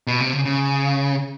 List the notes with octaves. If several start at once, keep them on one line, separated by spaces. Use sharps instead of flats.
B2
C3
C#3
C#3